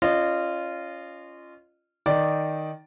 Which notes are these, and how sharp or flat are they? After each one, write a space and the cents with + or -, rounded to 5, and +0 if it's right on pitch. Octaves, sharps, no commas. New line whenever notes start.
C#4 +0 F4 -15 D#5 -30
D#3 +0 D#4 +0 D5 +0